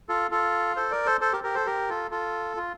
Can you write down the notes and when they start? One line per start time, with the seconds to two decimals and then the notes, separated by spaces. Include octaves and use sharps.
0.09 F4 A4
0.31 F4 A4
0.76 A4 C5
0.91 A#4 D5
1.06 A4 C5
1.21 A4 C5
1.32 G4 A#4
1.43 G4 A#4
1.55 A4 C5
1.66 G4 A#4
1.89 F4 A4
2.11 F4 A4
2.57 F4